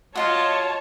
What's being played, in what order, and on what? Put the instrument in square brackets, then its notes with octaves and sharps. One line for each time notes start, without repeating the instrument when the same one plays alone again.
[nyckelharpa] F4 [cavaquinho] F#4 D#5 F#5 [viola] C#5 A5